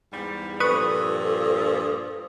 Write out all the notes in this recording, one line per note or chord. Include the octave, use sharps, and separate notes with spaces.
E2 G#2 G3
G2 A#2 F3 A4 B4 C#6 D#6